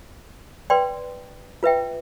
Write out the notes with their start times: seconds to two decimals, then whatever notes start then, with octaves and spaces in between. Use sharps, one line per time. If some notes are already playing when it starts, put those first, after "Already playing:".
0.70 B4 D5 G5 C6
1.63 F4 B4 E5 G5